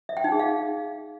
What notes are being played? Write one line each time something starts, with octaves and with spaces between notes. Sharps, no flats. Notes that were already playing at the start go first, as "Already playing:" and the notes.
E5
G5
D#4
G#4
F5